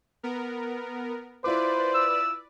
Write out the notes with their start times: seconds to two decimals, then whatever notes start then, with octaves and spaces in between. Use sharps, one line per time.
0.23 B3 A#4
1.44 E4 F4 B4 C5 D5 D6
1.94 E6